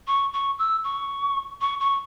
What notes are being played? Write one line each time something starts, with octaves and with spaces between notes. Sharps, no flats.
C#6
C#6
E6
C#6
C#6
C#6